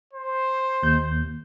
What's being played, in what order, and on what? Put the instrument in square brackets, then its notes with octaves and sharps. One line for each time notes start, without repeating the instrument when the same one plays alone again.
[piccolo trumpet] C5
[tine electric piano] D#2 G6